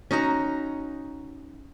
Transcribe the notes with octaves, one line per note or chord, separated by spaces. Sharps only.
C#4 D#4 F#4 A#5